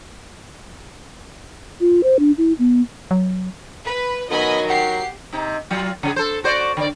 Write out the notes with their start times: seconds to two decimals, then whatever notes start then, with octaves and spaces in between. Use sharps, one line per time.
1.81 F4
2.03 C5
2.19 D4
2.38 E4
2.59 B3
3.11 F#3
3.86 B4 B5
4.31 D#3 F#3 B3 A#4 D#5 G#5 B5
4.70 G4 F#5 C7
5.33 C3 D#4
5.70 F#3 F4
6.03 C#3 C#4 G#4
6.16 A4 C5
6.44 F#4 C5 D5
6.77 D3 D5